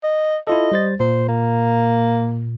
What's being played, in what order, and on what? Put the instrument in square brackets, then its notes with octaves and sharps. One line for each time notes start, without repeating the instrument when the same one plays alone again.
[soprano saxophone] D#5
[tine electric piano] E4 F4 A4 [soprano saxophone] D#5
[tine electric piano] G3 C5 A6
[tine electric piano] A#2 [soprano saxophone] C5
[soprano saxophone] A#3